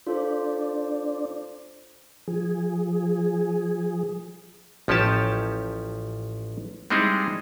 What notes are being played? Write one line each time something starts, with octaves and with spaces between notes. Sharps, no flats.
D4 F4 A4 C5
F3 G#4
A1 F3 C#4 G4 A5
G3 G#3 C4 D#4 E4 G#4